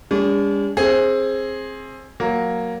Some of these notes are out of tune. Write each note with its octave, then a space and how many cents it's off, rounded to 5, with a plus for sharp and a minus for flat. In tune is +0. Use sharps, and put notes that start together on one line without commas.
G#3 -45 D4 -45
C4 +20 G#4 +0
F#3 +0 A#3 +0